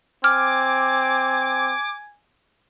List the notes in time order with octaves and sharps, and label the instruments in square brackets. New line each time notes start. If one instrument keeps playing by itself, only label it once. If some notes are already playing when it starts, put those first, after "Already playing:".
[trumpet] C4 [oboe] G#5 [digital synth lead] D6 [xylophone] F6